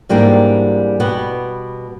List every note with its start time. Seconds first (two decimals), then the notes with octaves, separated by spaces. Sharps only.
0.09 G#2 E3 G3 A#3 D4
1.00 B2 G3 B3